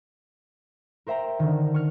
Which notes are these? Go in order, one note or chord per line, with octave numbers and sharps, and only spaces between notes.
A#4 C5 E5 G5 A#5
D3 D#3
C#6 F6